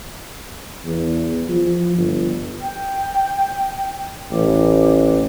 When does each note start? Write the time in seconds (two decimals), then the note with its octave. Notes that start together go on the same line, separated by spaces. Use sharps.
0.85 E2
1.49 F3
1.96 G1
2.60 G5
4.32 A1 D6